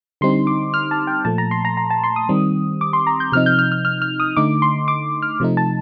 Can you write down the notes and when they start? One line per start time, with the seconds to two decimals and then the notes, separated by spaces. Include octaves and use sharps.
0.21 D3 G3 C4 D#4 C6
0.47 D6
0.74 F6
0.91 A5
1.07 G5
1.25 A#2 F3 A3 A5
1.38 A#5
1.51 C6
1.65 A#5
1.77 A#5
1.90 A5
2.04 C6
2.16 D#6
2.29 D#3 G3 C4
2.81 D6
2.93 C6
3.07 A#5
3.20 G6
3.32 C3 F3 C4 D#4 F6
3.46 G6
3.59 F6
3.72 F6
3.85 F6
4.02 F6
4.20 D#6
4.37 D3 A3 D#4 D6
4.62 C6
4.88 D6
5.22 F6
5.40 C3 F3 A3 D#4
5.57 A5